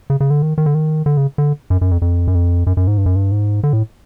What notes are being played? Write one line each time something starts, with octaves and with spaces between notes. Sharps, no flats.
C#3
C#3
D3
D#3
D#3
D3
D#3
D3
C#3
D3
F#2
F#2
F2
F2
F#2
F2
F#2
F#2
G#2
G2
F#2
G2
G#2
D3
A2